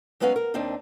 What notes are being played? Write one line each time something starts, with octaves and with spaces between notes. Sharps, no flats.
F#3 G#3 B3 C#4 B4 F5
A#4
D#2 C4 D4 D#4